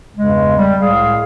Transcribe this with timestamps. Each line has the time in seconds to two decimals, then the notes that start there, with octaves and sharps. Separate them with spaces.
0.17 E2 G2 C#3 G#3
0.57 G3
0.82 C2 A2 G#3 G#4 F5